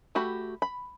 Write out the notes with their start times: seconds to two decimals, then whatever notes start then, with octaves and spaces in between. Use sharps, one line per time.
0.15 A3 F#4 G4 B5
0.62 B5